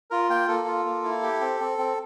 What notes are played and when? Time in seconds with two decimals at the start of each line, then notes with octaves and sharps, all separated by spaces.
0.11 F4 A#4
0.30 A#3 G5
0.48 A#3 A4
0.67 F4
0.85 A#3
1.04 E4
1.23 G4
1.41 C4
1.60 C4
1.78 C4